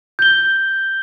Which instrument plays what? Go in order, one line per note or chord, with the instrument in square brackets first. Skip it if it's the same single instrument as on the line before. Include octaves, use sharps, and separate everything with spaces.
[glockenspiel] G6 G7